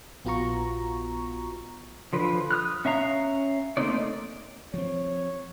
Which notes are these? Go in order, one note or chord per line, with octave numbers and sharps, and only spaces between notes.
A#1 B3 F4 F#4 A#5 C#6
D3 F3 B4
D#6 F6 F#6
C#4 E5 F5 A#5
A3 A#3 C4 D#4 D5
F3 C4 C#5